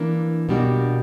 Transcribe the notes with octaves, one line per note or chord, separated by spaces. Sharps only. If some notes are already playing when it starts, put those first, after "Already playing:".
Already playing: E3 A#3 D4
B2 G3 A#3 D4 F#4